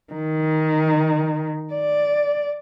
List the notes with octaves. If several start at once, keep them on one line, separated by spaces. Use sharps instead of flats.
D#3
D5